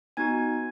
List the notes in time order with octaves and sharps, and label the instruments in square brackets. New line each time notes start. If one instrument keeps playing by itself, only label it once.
[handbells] B3 D#4 F#4 G#5 G#6